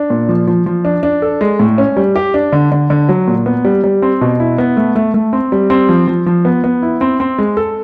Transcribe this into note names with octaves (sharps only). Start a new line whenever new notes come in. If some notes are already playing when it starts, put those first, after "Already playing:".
Already playing: D4
A#2
F3
F3
F3
D4
D4
A4
G#3
A2
C#4
G3
G4
D4
D3
D3
D3
F#3
A#2
B3
G3
G3
C4
B2
E4
B3
A3
A3
A3
C4
G3
C4
F3
F3
F3
B3
B3
E4
C4
C4
G#3
A4